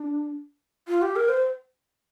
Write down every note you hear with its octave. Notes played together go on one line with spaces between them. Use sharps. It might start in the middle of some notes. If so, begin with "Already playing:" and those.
Already playing: D4
F4
G4
A#4
C5